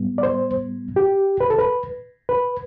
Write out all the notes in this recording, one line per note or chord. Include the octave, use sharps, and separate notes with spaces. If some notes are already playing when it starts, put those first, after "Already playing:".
Already playing: A2 G3 B3
D5
C5
G4
B4
A4
B4
B4